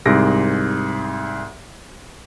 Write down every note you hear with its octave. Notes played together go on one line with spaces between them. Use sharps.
C2 G#2 G#4 A#6 D7